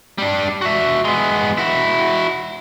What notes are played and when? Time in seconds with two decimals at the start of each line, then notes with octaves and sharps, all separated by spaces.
0.18 G3 D4
0.61 F#4 E5
1.05 G#3 B3
1.58 E4 F#4